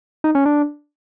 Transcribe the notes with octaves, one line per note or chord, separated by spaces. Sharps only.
D#4
C#4
D4